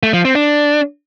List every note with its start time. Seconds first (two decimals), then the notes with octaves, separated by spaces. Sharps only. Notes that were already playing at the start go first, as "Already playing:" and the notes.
0.03 A3
0.13 F3
0.25 C4
0.35 D4